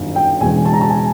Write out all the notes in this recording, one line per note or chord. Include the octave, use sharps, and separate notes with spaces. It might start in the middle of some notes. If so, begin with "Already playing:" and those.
Already playing: G1 F#2 D#3
G5
E1 E2 C#3 E3 G#5
A5
A#5
A5
G#5